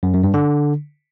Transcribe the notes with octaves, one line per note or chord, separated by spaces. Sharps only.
F#2
F#2
G2
D3